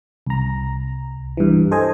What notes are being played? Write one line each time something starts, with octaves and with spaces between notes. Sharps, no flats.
C2 A#5
G2 E3
A4 C5 D#5 G#5